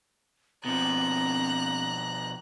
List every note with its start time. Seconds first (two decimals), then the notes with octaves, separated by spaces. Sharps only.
0.65 B2 F3 C4 A#5 F#6